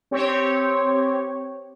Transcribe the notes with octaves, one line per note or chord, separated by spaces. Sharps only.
C4 G4 C#5